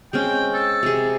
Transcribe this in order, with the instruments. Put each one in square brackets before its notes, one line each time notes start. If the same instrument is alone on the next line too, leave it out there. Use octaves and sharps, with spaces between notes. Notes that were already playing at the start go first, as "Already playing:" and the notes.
[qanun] G#3 C4 C#4 [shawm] G5
[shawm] A4
[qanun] C3 G#4